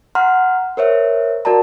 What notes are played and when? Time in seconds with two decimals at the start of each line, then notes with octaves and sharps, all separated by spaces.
0.15 F#5 A#5 C6 F6
0.77 A#4 C5 C#5 E5
1.45 F#4 A#4 D5 A5 A#5